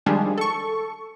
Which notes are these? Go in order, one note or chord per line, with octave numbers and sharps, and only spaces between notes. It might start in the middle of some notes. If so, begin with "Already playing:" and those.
D#3 F3 G3 G#3 D4 G#4
A4 C#6